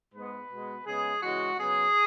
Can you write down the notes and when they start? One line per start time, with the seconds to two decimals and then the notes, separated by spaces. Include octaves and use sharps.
0.12 G#2 G#3 B3 B4
0.49 B2 G#3 B3
0.85 C#3 G#3 B3 G#4
1.21 C#3 E3 G#3 F#4
1.57 C#3 F#3 B3 G#4